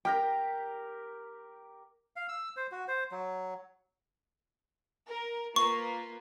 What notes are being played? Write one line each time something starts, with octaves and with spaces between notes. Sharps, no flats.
G4 A#4 G5 A#5
F5
E6
C5
F#4
C5
F#3
A#4
A#3 F4 B4 C#6